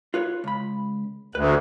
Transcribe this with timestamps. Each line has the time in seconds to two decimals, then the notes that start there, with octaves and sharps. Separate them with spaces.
0.14 F4 B4 C#5
0.44 C#2 B5
1.35 D2 B4